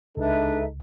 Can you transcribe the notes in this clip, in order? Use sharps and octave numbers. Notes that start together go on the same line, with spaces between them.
C#2 G#3 D4 D#4 A4 B4 E5